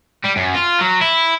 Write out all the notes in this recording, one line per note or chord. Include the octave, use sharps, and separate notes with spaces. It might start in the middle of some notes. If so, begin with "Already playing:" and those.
G3
F#2
F4
F#3
E4